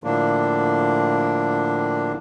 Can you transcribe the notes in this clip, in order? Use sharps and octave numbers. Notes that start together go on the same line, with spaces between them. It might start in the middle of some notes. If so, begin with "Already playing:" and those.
A2 D3 F3 A#3 D4